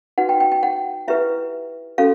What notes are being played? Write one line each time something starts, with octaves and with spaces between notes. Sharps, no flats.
D#4 F#4 B4 F#5
G5
G5
G5
F#5
E4 G4 B4 E5
C#4 F#4 A4 F5